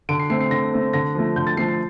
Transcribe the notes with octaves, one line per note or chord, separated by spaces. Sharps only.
D3 D7
C7
A3 C4 C7
C7
D3 A#6
A3 C4
D3 A#6
F3 A3
D3 G6
A6
F3 A3 C7
C7